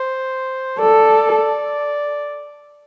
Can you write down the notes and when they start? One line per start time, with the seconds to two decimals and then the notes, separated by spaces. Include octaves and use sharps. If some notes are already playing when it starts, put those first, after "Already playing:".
Already playing: C5
0.79 A4 D5